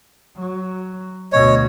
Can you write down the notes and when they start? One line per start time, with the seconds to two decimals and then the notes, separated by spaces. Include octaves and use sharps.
0.36 F#3
1.32 D2 B2 C#5 D#5